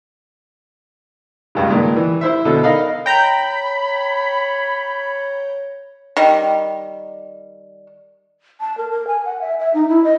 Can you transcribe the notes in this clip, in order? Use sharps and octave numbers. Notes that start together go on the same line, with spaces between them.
C#2 G2 C#3
A#2 D#3 G#3
E3
E4 C5 E5
B2 D3 A4
D#4 A#4 D#5 F5 B5
C#5 G5 A#5 B5 G6
D#3 G3
A5
A#4
A#4
G#5
F#5
E5
E5
D#4
E4
D#5